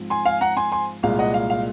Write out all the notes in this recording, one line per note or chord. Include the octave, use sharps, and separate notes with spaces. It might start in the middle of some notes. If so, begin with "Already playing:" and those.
Already playing: G#2 F3 C4
G#5 C6
F5 G#5
F#5 A#5
G#5 C6
G#5 C6
C2 A#2 G#3 F5
D#5 F#5
F5
F5